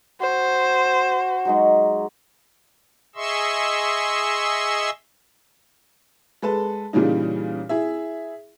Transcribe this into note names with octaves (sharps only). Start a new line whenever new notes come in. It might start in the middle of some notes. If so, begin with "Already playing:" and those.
F#4 C5
F#3 G#3 D#4
G#4 D#5 E5 C6 C#6 E6
G#3 A4 B4 A5
A#2 C#3 E3 G3 D#4
E4 G#4 E5